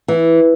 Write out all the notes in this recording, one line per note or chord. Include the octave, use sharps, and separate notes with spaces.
E3